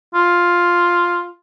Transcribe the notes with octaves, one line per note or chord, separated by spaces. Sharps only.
F4